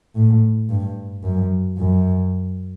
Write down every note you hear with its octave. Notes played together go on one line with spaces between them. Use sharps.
A2
G2
F#2
F#2